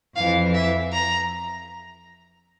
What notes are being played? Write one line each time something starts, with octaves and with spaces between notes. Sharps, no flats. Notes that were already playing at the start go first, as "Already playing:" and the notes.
F2 E3 F5
E5
A#5